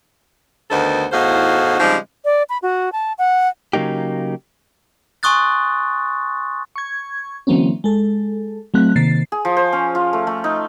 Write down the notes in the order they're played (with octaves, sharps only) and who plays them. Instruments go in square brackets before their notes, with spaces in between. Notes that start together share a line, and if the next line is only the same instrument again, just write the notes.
[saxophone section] D2 D3 D#3 B3 A4 C5
E2 A2 D#4 F#4 C5 F5
C#3 F3 G3 G#3 C4 D#4
[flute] D5
B5
F#4
A5
F#5
[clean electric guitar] C#3 F#3 A#3 D#4 G4
[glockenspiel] G#5 C6 C#6 D#6 F#6 A6
[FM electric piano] C#6 G#6
D3 E3 F#3 A#3 C4 C#4
G#3 A4
F#3 A3 C4 F#6
C3 D#3 A#3 A6 C7
[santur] G#4
F3
C5
C#4
F4
A3
A3
D#4